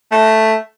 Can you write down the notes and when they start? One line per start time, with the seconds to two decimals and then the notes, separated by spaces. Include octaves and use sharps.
0.12 A3